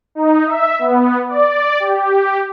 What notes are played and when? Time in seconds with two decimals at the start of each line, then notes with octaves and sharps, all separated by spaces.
0.15 D#4
0.46 E5
0.79 B3
1.28 D5
1.80 G4